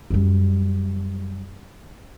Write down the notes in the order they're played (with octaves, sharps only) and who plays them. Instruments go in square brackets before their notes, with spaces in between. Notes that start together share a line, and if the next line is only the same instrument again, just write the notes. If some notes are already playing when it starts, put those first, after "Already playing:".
[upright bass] F#2 G3